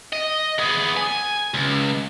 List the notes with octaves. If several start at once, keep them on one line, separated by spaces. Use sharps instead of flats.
D#5
B3 G#4
G#5
C#2